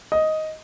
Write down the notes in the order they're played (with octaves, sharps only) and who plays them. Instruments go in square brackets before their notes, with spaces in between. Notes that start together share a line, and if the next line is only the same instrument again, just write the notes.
[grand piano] D#5